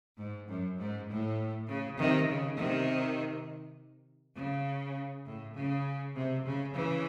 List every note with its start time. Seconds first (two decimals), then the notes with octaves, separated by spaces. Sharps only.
0.18 G#2
0.48 F#2
0.79 G#2
1.08 A2
1.67 C#3
1.98 C3 D#3
2.28 C#3
2.57 C3 D#3
4.35 C#3
5.25 A2
5.55 C#3
6.15 C3
6.44 C#3
6.74 C#3 E3